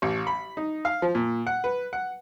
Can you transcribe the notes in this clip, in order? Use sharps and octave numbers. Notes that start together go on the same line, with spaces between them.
A1
B5
D#4
F5
F3
A#2
F#5
B4
F#5